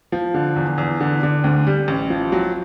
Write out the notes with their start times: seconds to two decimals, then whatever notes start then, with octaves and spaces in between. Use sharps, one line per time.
0.12 F3
0.34 D3
0.56 E2
0.78 E2
1.01 D3
1.23 D3
1.44 D2
1.67 G3
1.88 A1
2.10 F3
2.32 F#3